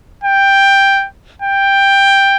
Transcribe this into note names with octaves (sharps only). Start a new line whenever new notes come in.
G5
G5